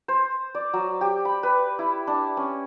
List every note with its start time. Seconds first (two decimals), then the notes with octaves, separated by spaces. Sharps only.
0.08 C5
0.55 D5
0.73 F#3
1.01 G4
1.25 B5
1.43 B4
1.79 E4
2.07 D4
2.37 C#4